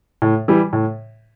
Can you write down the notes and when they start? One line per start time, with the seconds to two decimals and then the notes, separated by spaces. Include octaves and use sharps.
0.22 A2
0.48 E3 G3
0.73 A2